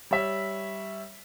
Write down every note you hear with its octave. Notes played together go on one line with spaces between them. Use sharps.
G3 C#5 E5 B6